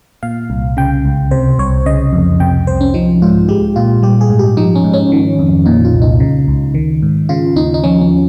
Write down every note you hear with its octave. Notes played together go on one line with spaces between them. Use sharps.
A#2 F5
C2
C#3 G5
C#2
C3 C5
C2 C#5
C#3 D#5
F2
C3 G5
C2 C5
C#4
F3 D#4
G#2 F4
G#3 G4
A#2 F4
G3 G4
G#4
G#2
G4
F3 D#4
C#4
G#2
C#4
D#3
F2
A#2 D#4
F4
C2
D#4
C#3
C#2
D#3
G#2
C#3 F4
D#2 D#4
D#4
F3 C#4
C#4